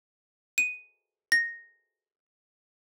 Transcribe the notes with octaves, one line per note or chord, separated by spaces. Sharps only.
D#7
A#6